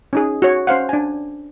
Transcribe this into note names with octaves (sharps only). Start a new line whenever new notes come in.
C#4 D#4 G#4
F#4 C#5
C#4 C5 F5 F#5
D4 G#5